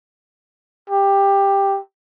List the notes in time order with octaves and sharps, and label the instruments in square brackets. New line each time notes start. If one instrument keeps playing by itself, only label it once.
[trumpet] G4